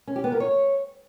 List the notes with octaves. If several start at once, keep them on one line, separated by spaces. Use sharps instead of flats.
C#4
G4
B3
A#4
C#5